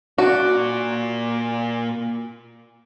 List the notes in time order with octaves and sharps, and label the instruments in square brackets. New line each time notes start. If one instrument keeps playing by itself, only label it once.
[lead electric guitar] A#2 D5 [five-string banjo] F#4